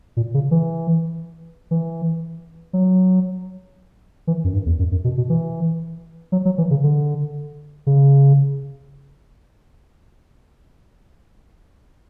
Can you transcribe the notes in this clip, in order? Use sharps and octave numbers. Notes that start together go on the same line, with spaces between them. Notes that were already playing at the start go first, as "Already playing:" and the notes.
A#2
C#3
E3
E3
F#3
E3
F#2
G2
E2
F#2
F#2
B2
B2
E3
F#3
F#3
E3
C#3
D3
C#3